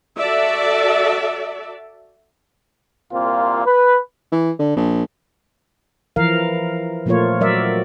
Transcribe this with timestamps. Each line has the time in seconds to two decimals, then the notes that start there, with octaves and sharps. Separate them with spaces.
0.18 F#4 A4 D5 E5
3.12 C2 A#2 A#3 C4 F4
3.66 B4
4.32 E3
4.59 D3
4.76 A#1
6.16 E3 F3 A#4 F5
7.06 A#2 F3 A3 A#3 F4 C#5
7.41 F#3 A#4 D5 E5